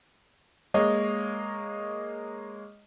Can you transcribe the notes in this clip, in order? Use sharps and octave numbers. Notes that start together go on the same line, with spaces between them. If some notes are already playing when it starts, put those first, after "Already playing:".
G#3 A#3 C#5 D#5